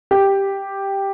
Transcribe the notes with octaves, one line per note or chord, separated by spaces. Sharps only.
G4